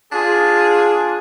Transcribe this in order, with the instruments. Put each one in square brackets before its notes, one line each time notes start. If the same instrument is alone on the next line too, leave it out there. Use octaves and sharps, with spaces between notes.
[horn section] D4 F4 G#4